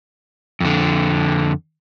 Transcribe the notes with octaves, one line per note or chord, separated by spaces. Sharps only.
F2 D3